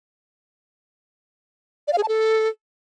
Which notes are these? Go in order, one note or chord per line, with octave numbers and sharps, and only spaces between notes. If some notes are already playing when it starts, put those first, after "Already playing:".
D5
F5
G#4
A5
A4